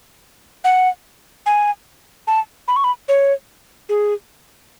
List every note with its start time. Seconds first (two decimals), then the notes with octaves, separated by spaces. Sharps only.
0.64 F#5
1.46 G#5
2.27 A5
2.68 B5
2.76 C#6
2.84 B5
3.08 C#5
3.89 G#4